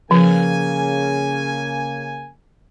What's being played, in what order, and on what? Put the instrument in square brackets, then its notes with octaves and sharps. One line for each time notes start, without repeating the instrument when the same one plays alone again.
[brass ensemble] C#3 A#3 G#5 [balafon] F3